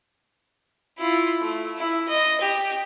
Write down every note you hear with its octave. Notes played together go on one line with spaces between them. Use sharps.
E4 F4
A3
E4
D#5
G4